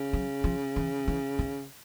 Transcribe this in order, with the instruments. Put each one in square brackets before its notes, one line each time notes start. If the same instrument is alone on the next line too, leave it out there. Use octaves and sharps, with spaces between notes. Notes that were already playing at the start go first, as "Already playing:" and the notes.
Already playing: [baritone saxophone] C#3
[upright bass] F#3
F3
E3
E3
D#3